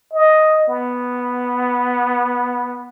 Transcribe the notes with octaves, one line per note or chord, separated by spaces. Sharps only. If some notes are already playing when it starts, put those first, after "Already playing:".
D#5
B3